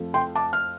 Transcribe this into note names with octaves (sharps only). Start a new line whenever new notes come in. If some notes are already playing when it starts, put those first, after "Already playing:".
Already playing: F2 F3 A3
G5 C6
A5 D6
F6